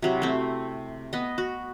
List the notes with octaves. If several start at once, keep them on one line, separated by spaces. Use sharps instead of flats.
C3 F#3 E4
A3 C4
B3 D#5
F#4